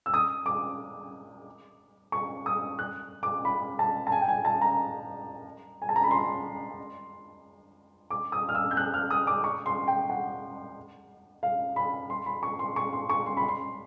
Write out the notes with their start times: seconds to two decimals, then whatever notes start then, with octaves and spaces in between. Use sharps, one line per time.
0.06 E6
0.14 D#6
0.46 D6
2.12 C#6
2.46 D#6
2.79 F#6
3.23 D6
3.45 B5
3.79 A5
4.07 A5
4.12 G#5
4.21 G5
4.28 G#5
4.45 A5
4.61 A#5
5.82 G#5
5.89 A5
5.96 A#5
6.04 B5
6.11 C6
8.10 D6
8.32 D#6
8.49 F6
8.55 E6
8.71 G6
8.77 F#6
8.94 F6
9.11 D#6
9.27 D6
9.44 C#6
9.66 C6
9.88 G5
10.10 F#5
11.43 F5
11.76 B5
12.10 C6
12.26 B5
12.43 C#6
12.59 C6
12.76 C#6
12.93 C6
13.09 C#6
13.26 C6
13.37 B5
13.48 C6